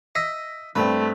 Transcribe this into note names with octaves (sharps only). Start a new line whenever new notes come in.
D#5 E5 B6
G2 A3 C4 B4